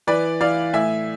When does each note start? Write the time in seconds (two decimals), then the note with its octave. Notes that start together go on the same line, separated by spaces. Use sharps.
0.07 E3 B4 D5
0.41 E3 D5 F5
0.73 A2 E5 G#5